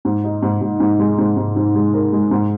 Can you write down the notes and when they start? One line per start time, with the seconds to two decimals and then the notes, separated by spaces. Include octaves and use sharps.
0.05 G#2
0.24 D#4
0.42 G#2
0.61 G#2
0.80 G#2
0.99 G#3
1.18 G#2
1.37 G#2
1.56 G#2
1.74 G#3
1.94 A#4
2.12 G#3
2.31 G#2